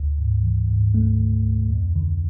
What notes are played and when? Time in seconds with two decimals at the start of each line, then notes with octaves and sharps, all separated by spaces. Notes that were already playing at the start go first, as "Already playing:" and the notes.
Already playing: D2
0.18 G#2
0.43 E3
0.69 G#2
0.94 D2 A3
1.19 D3
1.45 D2
1.70 F2
1.96 D3